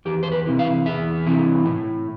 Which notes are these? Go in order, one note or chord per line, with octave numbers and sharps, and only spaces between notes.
E2 G4
C5
B4
C3 E3
F5
E2 E5
C3 E3
A2